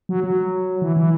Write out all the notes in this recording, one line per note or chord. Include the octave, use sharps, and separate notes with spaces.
F#3
F#3
E3
E3